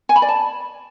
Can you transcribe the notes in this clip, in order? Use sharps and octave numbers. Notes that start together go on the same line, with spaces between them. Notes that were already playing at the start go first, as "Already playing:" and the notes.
G#5
B5
D5
A5